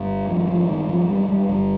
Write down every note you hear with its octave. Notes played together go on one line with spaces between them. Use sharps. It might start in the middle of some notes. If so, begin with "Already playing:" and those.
Already playing: G1 G2
G#1 G2 F3
F3
D#3
F3
G3
G3
G1 G2 G3